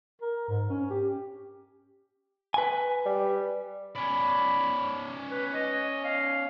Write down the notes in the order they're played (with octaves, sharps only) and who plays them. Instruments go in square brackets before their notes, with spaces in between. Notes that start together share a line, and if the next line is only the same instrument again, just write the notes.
[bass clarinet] A#4
G#2
C#4
G4
[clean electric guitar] B4 G#5
[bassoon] G3
[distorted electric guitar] C#4 D5 [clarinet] B5
[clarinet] B4
D#5
F5